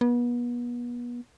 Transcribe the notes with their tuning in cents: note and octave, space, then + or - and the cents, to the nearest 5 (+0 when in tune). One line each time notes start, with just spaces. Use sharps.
B3 -35